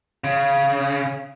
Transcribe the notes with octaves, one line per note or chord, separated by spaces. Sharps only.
C#3